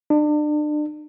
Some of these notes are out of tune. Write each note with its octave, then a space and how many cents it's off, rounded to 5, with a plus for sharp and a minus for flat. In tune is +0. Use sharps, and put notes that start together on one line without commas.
D4 +35